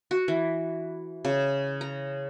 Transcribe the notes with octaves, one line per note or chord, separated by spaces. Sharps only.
F#4
E3
C#3
A#5